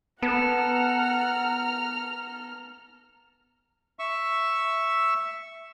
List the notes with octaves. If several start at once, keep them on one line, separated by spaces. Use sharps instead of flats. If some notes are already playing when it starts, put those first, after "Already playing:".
B3 A4 F#5 A#5 F6
E5 C#6 E6